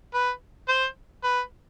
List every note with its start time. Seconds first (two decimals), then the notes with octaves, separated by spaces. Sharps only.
0.14 B4
0.68 C5
1.23 B4